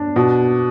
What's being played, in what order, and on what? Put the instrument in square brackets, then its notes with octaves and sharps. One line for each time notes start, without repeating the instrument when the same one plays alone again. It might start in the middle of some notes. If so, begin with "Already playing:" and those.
Already playing: [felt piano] D4
[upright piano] B2